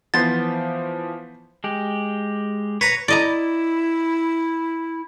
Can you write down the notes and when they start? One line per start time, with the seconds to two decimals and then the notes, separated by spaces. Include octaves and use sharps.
0.14 E3 F3 B3 C5 A6
1.64 G#3 G4
2.81 B4 C#5 A#5
3.08 E4 D5 D#5 A#5